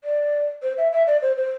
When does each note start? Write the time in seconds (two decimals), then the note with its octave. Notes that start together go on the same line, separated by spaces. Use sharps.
0.04 D5
0.63 C5
0.78 E5
0.92 E5
1.07 D5
1.22 C5
1.37 C5